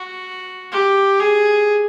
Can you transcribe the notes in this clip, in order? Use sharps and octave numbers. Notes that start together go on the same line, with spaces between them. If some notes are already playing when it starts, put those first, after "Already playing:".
Already playing: F#4
G4
G#4